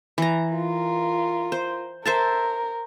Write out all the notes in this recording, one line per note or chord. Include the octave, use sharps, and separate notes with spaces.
E3 A#5
F4 A#4
C5
A#4 C5 E5 A5